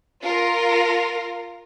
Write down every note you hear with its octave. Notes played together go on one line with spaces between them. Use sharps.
F4 A#4